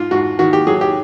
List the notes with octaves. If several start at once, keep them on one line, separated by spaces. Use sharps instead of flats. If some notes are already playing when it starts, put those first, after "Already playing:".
Already playing: G#2 F4
G#2 F#4
D#3 F#4
G4
F#3 G#4
G4